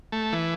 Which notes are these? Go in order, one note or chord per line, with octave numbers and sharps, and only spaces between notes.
A3
E3